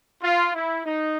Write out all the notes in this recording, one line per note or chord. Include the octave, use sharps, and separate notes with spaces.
F4
E4
D#4